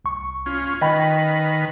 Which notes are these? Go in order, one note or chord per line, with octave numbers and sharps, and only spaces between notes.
C2 C#6
C#4 F4
D#3 B4 D#5 G5 B5